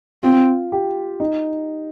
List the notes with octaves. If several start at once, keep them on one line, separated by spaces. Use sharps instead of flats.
C4 F4
G4
D#4